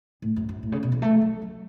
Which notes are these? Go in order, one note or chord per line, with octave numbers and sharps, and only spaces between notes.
A2
F#2
F#2
A2
C#3
B2
E3
A3
F#3
F#3